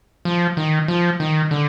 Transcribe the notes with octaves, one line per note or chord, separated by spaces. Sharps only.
F3
D#3
F3
D#3
D3